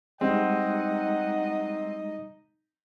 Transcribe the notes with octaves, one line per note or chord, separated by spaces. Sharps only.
G3 G#3 C4 D#4 D#5 F#5